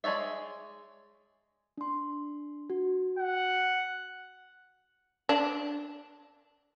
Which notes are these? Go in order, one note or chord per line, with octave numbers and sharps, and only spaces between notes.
G#3 D4 C#5 D5 E5
D4 C6
F#4
F#5
D4